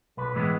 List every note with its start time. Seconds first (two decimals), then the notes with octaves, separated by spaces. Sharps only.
0.17 B1 B4
0.34 A2 E3 G#3 B3